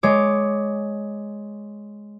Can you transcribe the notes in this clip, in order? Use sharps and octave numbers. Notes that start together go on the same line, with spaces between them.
G#3 C#5 D6